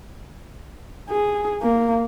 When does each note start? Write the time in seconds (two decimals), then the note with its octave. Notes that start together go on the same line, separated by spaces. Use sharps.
1.10 G#4
1.62 A#3